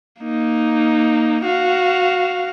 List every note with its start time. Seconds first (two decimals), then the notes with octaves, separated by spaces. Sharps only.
0.22 A#3 D#4
1.45 F#4 F5